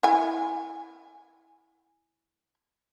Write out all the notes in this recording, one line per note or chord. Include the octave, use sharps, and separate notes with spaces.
E4 G#5